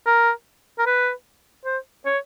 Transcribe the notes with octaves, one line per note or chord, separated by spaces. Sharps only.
A#4
A#4
B4
C5
C#5